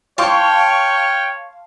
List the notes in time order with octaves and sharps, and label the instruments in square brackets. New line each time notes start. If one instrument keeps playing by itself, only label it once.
[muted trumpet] C#5 [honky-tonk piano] F5 C6 C#6 [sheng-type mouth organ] G5 F6 [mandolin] A5